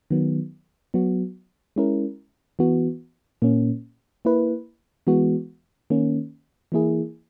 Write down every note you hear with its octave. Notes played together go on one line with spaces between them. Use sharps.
D#3 F#3 B3
F#3 B3 F#4
G#3 C#4 E4 A#4
E3 B3 F#4
A#2 A#3 C#4
A#3 E4 B4
E3 G#3 B3 F#4
D#3 A#3 C#4
E3 A#3 E4 G#4